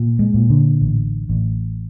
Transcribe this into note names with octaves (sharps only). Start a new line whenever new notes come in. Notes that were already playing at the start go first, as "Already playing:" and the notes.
Already playing: A#2
G#3
A#2
D3
A1
A1